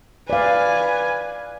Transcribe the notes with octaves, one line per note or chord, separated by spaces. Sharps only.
B4 D5 F5 G#5